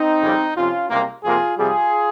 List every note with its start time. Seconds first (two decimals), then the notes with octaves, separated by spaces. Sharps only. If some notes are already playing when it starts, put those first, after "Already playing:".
Already playing: C4 D#4
0.23 F2 C#3 G3
0.56 F2 C3 F3 C#4 F4
0.90 C#2 C3 G3 A#3
1.24 F2 C3 F3 A#3 F4 G#4
1.58 F2 C3 G3 F4 G#4